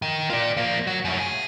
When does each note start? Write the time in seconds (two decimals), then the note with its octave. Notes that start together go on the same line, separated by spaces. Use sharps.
0.02 D#3
0.30 F4 D5
0.57 F3 A#3
0.87 F#3
1.05 F#2 A2
1.20 G#4